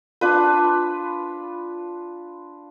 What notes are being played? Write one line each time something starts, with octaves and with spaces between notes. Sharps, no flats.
D4 F4 B4